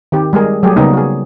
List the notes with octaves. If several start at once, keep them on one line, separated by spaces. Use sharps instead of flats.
D#3 C4 G4
G3 G#3 G#4 A#4
F#3 G3 A3 G4 G#4
C#3 G3 A#3 B3 D#4
F#4 G#4